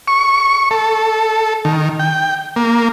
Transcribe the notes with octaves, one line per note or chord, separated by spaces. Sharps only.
C#6
A4
D#3
G5
A#3